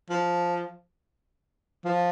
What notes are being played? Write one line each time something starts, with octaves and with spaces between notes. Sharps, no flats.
F3
F3